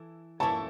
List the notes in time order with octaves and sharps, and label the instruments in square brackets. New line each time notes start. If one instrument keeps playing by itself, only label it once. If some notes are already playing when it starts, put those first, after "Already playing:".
Already playing: [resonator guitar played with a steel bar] E3 E4 A4
[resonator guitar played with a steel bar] E3 A3 E4 A4 C#5 [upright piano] A5